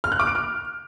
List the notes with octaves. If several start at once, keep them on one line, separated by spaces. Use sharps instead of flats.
F6
F#6
D6
D7
F6